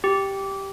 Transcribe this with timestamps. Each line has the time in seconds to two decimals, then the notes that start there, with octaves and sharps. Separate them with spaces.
0.04 G4